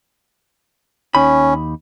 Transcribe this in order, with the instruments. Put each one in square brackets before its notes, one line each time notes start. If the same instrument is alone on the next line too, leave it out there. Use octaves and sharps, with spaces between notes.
[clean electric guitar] D#2 D#4 B5 [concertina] C#4